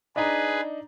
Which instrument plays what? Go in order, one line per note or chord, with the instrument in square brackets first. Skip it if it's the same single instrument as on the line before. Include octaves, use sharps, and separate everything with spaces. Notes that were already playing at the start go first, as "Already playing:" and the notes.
[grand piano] D4 D#4 A#5 [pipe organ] G#4 B4